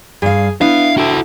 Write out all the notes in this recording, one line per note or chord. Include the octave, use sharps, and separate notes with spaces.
G2 G#4 F5
B3 D4 E4 F5
F#4 A4 G5